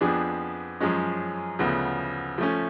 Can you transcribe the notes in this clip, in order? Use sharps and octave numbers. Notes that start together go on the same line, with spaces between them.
F2 F3 B3 D4 G#4
F#2 F3 G#3 C#4
D2 C#3 F3 B3
F3 A3 C#4